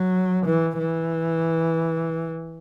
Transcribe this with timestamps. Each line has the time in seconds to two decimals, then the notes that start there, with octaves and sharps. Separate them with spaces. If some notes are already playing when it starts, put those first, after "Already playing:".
Already playing: F#3
0.45 E3
0.78 E3